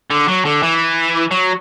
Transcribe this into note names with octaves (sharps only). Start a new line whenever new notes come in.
D3
F#3
D3
E3
F#3